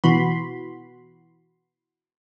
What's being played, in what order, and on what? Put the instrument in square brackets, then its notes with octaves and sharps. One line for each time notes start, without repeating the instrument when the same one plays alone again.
[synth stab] B2 E3 F#4 B5 C6